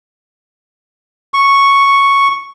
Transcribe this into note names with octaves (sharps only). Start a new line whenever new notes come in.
C#6